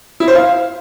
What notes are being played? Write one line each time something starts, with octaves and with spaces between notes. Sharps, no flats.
E4
C5
F5